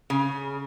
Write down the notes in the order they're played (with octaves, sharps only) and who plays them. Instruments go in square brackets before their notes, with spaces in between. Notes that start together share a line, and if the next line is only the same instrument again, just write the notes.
[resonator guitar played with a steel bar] C#3